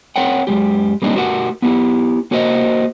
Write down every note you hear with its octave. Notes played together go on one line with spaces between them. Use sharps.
C4 A#4 C#5 F#5 G5
F#2 A#2 G#3 G4
G3 A#3 C4 D4 D#4
A3 F#4 G4 A#4 D5 F#5
B3 E4 G4
A#3 F#4 A#4 C5 D#5